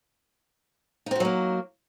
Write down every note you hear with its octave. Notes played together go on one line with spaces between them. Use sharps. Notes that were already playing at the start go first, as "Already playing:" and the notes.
F#3 A#3 C4 D#4 F#4